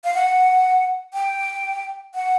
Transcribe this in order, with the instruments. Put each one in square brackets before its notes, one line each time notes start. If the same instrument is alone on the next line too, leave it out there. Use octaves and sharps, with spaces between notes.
[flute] F5
F#5
G5
F#5